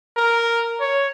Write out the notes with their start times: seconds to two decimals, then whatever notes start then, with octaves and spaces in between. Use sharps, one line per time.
0.17 A#4
0.80 C#5